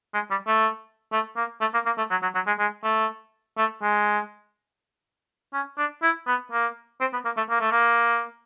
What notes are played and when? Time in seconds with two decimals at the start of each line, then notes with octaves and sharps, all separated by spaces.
0.14 G#3
0.31 G3
0.47 A3
1.13 A3
1.37 A#3
1.61 A3
1.74 A#3
1.86 A#3
1.98 A3
2.11 F#3
2.22 F#3
2.35 F#3
2.47 G#3
2.59 G#3
2.84 A3
3.58 A3
3.82 G#3
5.54 C#4
5.78 D4
6.03 E4
6.27 B3
6.52 A#3
7.01 C4
7.13 B3
7.25 A#3
7.37 A3
7.50 A#3
7.61 A3
7.71 A#3